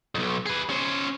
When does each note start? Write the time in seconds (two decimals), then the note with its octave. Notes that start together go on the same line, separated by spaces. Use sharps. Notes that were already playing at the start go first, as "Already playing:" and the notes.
0.15 B1 F2
0.46 G#4 B4
0.70 C#4 C5